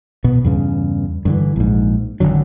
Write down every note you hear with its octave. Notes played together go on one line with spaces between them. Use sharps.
B2 B3
E2 G2 C#3
G2 D3 E3
A#1 G#2
G#1 C#2 D3 F#3